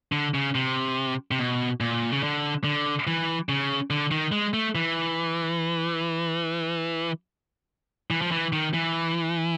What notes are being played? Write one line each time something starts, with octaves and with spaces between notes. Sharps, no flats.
D3
C#3
C3
C3
B2
A#2
C#3
D3
D3
E3
C#3
D3
D#3
G#3
A3
E3
E3
F3
E3
D#3
E3